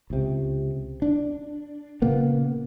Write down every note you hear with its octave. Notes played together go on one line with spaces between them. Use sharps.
C#2 C3
D4
A#2 C#3 A#3 B3